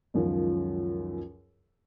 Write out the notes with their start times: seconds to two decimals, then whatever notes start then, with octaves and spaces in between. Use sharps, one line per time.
0.14 C#2 F#2 D#3 F3 F4